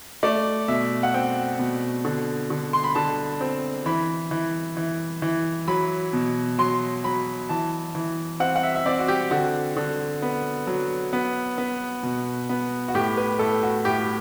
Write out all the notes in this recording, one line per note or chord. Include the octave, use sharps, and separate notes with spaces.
A3 D5
B2 E5
F#5
C4 G5
B2
D3
D3
C6
B5
D3 A5
C4
E3 B5
E3
E3
E3
F#3 B5
B2
F#3 C6
F#3 B5
E3 A5
E3
C4 F#5
F#5
E5
E5
C4 D5
F#4
G4
D3 F#4
D3
B3
F#3
B3
B3
B2
B3
F#4
A2 G4
B4
A2 A4
F#4
A2 G4